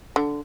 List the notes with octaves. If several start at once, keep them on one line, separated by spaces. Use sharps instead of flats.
D3